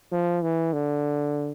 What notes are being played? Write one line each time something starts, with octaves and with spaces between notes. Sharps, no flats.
F3
E3
D3